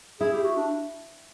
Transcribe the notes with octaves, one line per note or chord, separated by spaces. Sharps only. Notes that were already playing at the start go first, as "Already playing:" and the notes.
E4 G#4
G4
F#4
D4